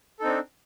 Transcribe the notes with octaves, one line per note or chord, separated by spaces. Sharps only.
C4 D4 D#4 A4